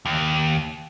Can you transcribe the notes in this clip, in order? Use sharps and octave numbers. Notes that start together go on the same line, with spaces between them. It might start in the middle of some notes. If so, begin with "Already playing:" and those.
D#2